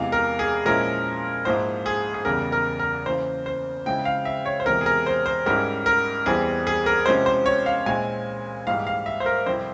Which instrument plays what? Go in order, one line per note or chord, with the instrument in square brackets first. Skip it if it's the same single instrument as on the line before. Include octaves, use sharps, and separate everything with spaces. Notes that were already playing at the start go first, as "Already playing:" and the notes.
Already playing: [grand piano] E2 C3 E3 G#3 F5
A#4
G#4
A#2 F3 G#3 C#4 E4 A#4
G#2 F3 A#3 E4 C5
G#4
G#4
E2 C#3 G3 A#4
A#4
A#4
C#3 E3 A#3 C#4 C5
C5
C#3 F3 G#3 C4 E4 G5
F5
E5
C#5
C5
E2 C3 E3 G#3 C4 A#4
G#4
A#4
C5
C5
G#2 G3 C#4 E4 A#4
A#4
E2 E3 G3 C4 G#4
G#4
A#4
C3 F3 G#3 C#4 E4 C5
C5
C#5
F5
A#2 G#3 C4 E4 G#5
G#2 E3 G3 A#3 F5
F5
E5
C5
A#4
F2 C3 G3 C4 E4 C5